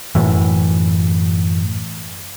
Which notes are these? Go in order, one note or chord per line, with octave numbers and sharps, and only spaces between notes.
F#2 A2 E3